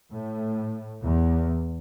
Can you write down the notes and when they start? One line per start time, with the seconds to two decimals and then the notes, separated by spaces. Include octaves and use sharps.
0.11 A2
1.02 E2